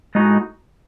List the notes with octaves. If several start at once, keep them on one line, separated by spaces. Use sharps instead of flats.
A2 G#3 D#4 F#4